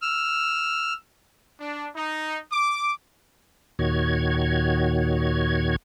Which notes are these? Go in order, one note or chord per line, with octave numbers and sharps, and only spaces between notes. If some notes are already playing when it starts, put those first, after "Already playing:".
E6 F6
D4
D#4
D6
D#2 A#2 D#3 F#4 C#5 G#6